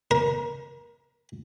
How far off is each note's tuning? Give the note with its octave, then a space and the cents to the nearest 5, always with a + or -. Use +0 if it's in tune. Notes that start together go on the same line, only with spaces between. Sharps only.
A#4 +30